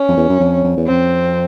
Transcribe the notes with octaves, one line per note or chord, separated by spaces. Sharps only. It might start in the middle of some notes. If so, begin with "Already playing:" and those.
Already playing: C#4
F2
E2
F#2
F2
F2
E2
F2 C4